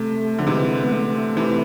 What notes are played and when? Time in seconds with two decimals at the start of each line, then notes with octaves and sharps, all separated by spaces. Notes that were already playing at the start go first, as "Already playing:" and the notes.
Already playing: C3 A3
0.39 D3 F3
0.47 C3 E3 G#3
0.84 B3
0.92 A3
1.37 C3 E3